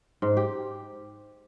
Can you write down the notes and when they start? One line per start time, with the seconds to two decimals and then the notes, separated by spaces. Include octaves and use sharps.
0.22 G#2
0.37 G4